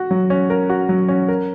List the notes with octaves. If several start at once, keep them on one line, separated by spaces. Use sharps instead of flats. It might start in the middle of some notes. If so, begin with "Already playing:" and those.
Already playing: F#4
F#3
C#4
A#4
F#4
F#3
C#4
A#4